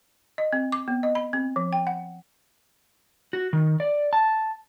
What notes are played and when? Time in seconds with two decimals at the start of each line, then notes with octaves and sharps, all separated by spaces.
0.38 D#5
0.53 C4
0.72 D6
0.88 B3
1.03 D#5
1.15 B5
1.33 C4
1.56 F3
1.73 G5
1.87 F#5
3.33 F#4
3.53 D#3
3.80 D5
4.13 A5